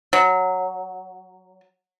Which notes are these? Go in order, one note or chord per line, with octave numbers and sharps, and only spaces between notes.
F#3